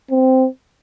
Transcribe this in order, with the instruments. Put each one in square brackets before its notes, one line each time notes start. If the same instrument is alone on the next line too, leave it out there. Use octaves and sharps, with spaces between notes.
[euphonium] C4